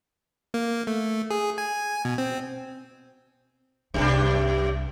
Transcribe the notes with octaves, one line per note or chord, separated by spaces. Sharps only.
A#3
A3
G#4
G#5
B2
C4
C2 F#2 G3 D4 D#4